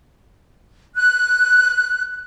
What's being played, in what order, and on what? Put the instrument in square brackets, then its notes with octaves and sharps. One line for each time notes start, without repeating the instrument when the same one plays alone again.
[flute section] F#6